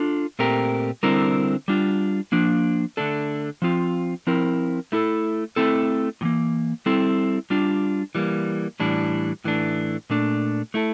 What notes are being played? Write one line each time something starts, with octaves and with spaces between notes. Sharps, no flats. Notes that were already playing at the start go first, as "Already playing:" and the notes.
Already playing: D4 F4 A4
A#2 A3 C4 G4 A#4
D3 G3 C4 E4 A#4
G3 D4 F4
F3 A#3 D4
D3 A3 D4 A4
F3 C4 F4
F3 C4 E4 A#4
A3 E4 A4
A3 C4 E4 A4
A2 E3 A#3
G3 C4 E4 A4
G3 D4 F4
E3 G3 A#3
A2 E3 G3 D4
A2 E3 A3 D4
A#2 A3 D4
A3 E4 A4